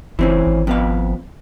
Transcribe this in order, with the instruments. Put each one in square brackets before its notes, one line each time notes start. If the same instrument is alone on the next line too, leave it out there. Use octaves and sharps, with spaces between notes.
[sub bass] F#1 [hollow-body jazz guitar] E3 C4 C#4
[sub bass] G#1
[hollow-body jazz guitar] F2 B3 F5